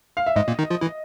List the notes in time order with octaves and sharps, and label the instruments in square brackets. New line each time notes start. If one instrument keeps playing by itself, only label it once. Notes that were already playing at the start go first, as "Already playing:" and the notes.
[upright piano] F5
E5
[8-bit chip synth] G#2 G#3 [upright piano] D#5
[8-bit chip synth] A#2 A#3
D#3 D#4
F3 F4
E3 E4